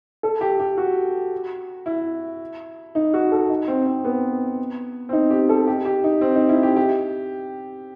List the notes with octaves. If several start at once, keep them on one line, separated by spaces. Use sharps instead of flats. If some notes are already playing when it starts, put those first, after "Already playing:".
A4
G4
G4
F#4
E4
D#4
F#4
A4
D#4
C4
C4
B3
C4
D#4
G4
A4
G4
G4
D#4
C4
D#4
E4
G4
G4